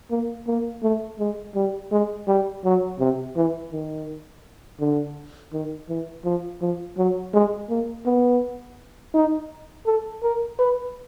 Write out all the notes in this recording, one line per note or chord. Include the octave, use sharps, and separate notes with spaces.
A#3
A#3
A3
G#3
G3
G#3
G3
F#3
C3
E3
D#3
D3
D#3
E3
F3
F3
F#3
G#3
A#3
B3
D#4
A4
A#4
B4